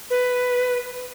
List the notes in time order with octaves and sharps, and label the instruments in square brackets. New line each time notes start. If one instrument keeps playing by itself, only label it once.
[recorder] B4